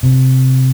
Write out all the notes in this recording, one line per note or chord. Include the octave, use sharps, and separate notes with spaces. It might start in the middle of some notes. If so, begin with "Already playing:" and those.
C3